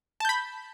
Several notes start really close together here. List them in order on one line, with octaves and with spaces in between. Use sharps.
A5 G6 B5